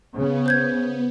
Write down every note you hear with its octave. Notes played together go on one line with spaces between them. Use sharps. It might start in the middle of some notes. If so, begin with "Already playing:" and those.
C#3 B3
C5 G6 G#6